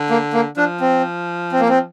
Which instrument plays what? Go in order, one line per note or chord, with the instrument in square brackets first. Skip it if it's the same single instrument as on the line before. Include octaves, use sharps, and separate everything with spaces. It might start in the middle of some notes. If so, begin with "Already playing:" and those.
Already playing: [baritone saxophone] D3
[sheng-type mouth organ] A#3
A#3
[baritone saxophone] F3 [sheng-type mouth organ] D4
[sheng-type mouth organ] C4
C4
A#3
C4